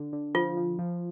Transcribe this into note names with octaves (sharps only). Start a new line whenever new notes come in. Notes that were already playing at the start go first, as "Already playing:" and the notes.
Already playing: D3
D3
F3 F4
F3
F3